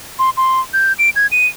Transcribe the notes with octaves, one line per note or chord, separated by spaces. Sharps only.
C6
C6
G6
D7
G#6
D#7